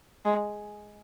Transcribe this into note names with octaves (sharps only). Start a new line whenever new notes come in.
G#3